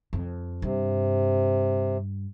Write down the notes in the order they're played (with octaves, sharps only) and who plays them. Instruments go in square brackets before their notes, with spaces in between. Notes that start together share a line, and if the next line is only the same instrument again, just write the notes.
[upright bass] F2
[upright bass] G2 [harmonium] C3